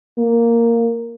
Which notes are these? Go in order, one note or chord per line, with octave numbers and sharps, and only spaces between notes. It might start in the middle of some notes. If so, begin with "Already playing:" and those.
A#3